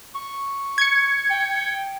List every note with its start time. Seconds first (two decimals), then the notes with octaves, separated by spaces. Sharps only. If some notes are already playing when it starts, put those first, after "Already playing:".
0.15 C#6
0.78 G#6 C#7
1.31 G5